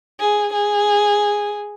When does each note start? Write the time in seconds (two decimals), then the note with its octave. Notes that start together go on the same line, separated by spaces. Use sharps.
0.20 G#4
0.53 G#4